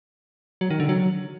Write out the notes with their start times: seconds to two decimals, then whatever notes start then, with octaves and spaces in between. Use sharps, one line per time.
0.61 F#3
0.70 D#3
0.80 D3
0.89 F#3